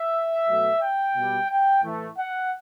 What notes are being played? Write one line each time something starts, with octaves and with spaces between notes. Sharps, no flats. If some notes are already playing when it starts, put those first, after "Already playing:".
Already playing: E5
B2 F#3 A3
G5
B2
G3
G5
A2 E3 A3
F#5